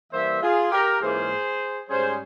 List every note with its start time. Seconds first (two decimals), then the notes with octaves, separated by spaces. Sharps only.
0.12 E3 G3 A#3 C5 E5
0.42 F4 G#4
0.71 G4 A#4
1.01 G#2 E3 A#3 C#4 F4 G#4 C5
1.88 G#2 G3 C#4 G#4 C5